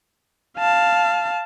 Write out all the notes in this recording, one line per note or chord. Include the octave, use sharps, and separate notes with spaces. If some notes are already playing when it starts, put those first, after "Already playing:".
F5 A5